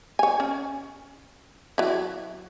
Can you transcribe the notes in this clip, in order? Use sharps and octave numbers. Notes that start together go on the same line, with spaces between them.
C#5 G#5
C#4
F#3 E4